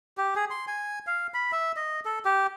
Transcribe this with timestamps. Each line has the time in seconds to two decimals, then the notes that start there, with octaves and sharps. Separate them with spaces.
0.18 G4
0.36 G#4
0.50 C6
0.67 G#5
1.07 F5
1.34 B5
1.52 E5
1.76 D#5
2.05 A4
2.25 G4